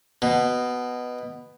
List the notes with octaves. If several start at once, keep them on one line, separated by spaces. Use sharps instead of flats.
B2